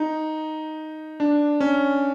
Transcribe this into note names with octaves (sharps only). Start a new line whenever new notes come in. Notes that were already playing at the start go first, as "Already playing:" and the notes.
Already playing: D#4
D4
C#4